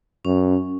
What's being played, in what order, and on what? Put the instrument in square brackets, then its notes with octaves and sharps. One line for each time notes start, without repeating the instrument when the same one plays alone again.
[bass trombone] F#2 [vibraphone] C#4